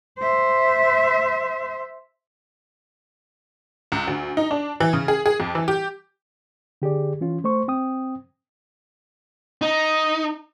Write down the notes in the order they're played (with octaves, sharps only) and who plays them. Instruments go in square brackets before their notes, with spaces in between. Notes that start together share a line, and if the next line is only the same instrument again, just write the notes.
[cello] C5 E5
[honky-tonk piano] C#2
D2
D#4
D4
E3
C#3
G#4
G#4
F2
E3
G4
[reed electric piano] D3 G4 G#4 D5
E3 C#4 F4
A3 C5 C#6
C4 G5 D#6
[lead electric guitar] D#4